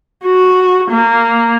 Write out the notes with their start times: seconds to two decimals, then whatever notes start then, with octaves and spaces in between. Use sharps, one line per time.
0.25 F#4
0.91 A#3